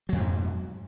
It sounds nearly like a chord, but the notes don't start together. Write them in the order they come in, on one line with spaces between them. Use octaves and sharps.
F#3 F2 B2 G#2